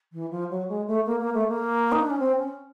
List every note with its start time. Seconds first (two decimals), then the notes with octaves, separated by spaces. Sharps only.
0.13 E3
0.31 F3
0.50 F#3
0.68 G#3
0.87 A3
1.06 A#3
1.20 A#3
1.34 A3
1.47 A#3
1.92 D#4
2.00 D4
2.10 C#4
2.19 C4
2.37 C#4